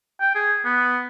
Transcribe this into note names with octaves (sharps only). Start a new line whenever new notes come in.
G5
G#4
B3